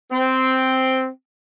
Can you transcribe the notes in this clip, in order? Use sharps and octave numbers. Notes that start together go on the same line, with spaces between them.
C4